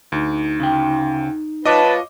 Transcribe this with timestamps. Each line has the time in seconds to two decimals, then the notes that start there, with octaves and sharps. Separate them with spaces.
0.12 D2 D#4
0.60 C#3 G5
1.66 F4 B4 C#5 D#5 F5 A5 D6